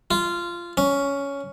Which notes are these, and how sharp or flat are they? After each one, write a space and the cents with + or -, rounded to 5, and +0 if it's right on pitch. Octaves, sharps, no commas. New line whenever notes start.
F4 -15
C#4 +10